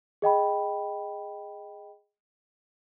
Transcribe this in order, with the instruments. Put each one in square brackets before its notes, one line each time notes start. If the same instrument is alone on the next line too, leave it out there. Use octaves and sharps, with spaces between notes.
[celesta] G#4 D#5 G5 B5